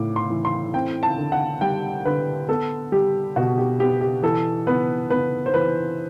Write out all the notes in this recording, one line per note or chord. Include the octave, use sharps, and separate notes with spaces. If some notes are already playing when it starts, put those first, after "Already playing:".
Already playing: A2 D6
C6
E3
C6
C4 G5
A5
D3
F#5
G3 G5
D3 B4
B3 A4
G3 G4
B2 F#4
G4
B3 G4
G4
E3 A4
B3 B4
B3 B4
C5
E3 B4